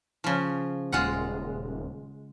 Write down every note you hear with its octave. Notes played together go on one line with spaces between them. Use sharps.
C#3 F3
D#1 G#3 F4 F#5